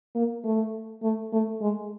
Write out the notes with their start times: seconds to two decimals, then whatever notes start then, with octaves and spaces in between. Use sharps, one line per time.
0.15 A#3
0.44 A3
1.03 A3
1.33 A3
1.61 G#3